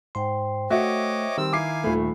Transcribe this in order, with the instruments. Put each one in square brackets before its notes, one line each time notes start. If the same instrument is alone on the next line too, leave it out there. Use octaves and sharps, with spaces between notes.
[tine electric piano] G#2 C6 [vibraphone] C5 G5
[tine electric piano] A3 [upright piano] F#4 E5 [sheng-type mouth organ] C#5 D#5 D6
[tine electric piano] D#3 [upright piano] G3 [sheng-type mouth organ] C4 E6
[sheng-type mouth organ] E4 F5 G#5 [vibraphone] A#5 [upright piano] D6 C7
[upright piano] D#1 A3 [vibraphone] B5